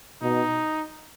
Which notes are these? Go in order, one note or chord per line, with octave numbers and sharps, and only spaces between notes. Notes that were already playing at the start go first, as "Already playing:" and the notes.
B2 D#4